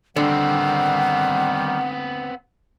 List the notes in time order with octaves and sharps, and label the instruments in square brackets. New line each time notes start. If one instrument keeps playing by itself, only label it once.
[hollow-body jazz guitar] D3 [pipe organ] D#3 G3 [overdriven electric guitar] B3 C4 [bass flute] F#5